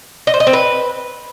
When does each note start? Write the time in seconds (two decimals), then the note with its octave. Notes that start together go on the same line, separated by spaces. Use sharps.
0.27 D#5
0.34 C5
0.40 D#5
0.47 C4
0.53 B4